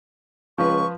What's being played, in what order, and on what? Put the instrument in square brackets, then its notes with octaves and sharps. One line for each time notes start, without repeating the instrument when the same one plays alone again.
[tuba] C#2 [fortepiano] F3 B4 [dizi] C#6